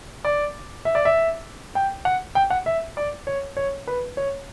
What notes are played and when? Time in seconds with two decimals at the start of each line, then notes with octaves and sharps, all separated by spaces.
0.25 D5
0.85 E5
0.95 D5
1.05 E5
1.75 G5
2.05 F#5
2.35 G5
2.50 F#5
2.66 E5
2.97 D5
3.27 C#5
3.57 C#5
3.87 B4
4.17 C#5